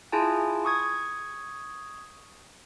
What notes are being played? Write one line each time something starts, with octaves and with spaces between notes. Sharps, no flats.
E4 F4 G#4 G#5 A5
C#6 D#6 G#6